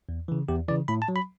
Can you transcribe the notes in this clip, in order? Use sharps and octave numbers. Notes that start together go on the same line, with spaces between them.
E2
C#3 E3
E2 G4
C#3 E3 D5
A2 B5
A5
F#3
B5